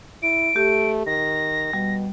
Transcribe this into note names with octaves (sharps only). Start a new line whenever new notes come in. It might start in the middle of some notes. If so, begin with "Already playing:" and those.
E4 D7
A3 G4
D#3 A#6
B2 G3